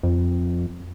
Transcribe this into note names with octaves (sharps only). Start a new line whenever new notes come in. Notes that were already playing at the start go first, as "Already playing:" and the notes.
F2